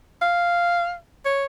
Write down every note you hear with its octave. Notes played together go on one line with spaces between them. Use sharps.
F5
C#5